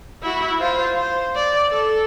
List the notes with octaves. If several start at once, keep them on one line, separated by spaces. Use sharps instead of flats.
E4 F#4
F4 C5
C5
D5
A4